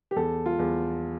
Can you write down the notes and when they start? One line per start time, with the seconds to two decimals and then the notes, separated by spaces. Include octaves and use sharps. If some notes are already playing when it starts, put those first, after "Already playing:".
0.11 G4
0.16 E2 A4
0.46 F4
0.59 E2